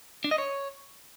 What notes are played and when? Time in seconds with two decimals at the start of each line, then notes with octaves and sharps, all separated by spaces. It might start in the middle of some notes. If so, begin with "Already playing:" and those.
0.24 D4
0.31 D#5
0.38 C#5